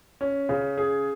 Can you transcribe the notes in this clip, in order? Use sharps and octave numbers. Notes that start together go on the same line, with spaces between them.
C#4
C#3
G#4